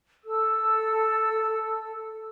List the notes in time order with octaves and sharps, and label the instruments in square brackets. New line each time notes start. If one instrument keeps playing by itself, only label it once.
[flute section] A4 E6